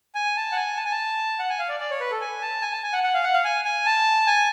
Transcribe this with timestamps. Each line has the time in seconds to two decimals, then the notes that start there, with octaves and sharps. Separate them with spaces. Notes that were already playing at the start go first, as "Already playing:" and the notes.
0.15 G#5
0.37 A5
0.52 F#5
0.56 G#5
0.77 A5
0.85 G#5
0.91 A5
1.39 F#5
1.50 G#5
1.59 F5
1.69 D5
1.80 D5
1.91 C#5
2.00 B4
2.11 A4
2.21 G#5
2.42 A5
2.62 G#5
2.72 A5
2.83 G#5
2.93 F#5
3.03 F#5
3.14 F5
3.24 F#5
3.34 F5
3.44 G#5
3.65 G#5
3.86 A5
4.27 G#5